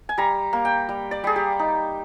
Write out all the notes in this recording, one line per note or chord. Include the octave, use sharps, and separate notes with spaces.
G#5
G3 A#5
A#3
G5
G3
D5
G3 G#4
G4
D#4